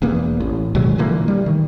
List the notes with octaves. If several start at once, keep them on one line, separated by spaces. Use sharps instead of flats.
E1 E2 A#3
A1
B2 D#3 F#3 G#3
A#2 D3 E3 A#3
G3
D#3